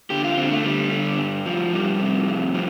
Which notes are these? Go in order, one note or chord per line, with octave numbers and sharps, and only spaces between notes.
D3 G4
F4
D3 C4
A3
D3 G3
D3
G2
F3
F2 G3
C3
F2
F3